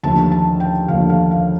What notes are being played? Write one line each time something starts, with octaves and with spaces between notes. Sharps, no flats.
D#2 D3 F3 A3 A5
A5
G5
D#2 D3 F3 A3 F5
F5
F5